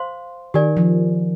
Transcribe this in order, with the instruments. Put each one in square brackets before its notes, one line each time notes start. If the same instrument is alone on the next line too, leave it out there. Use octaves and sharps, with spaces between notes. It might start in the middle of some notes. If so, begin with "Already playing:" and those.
Already playing: [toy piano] C5 F5 C6
[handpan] D#3 [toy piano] G4 A#4 D5 G#5
[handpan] F3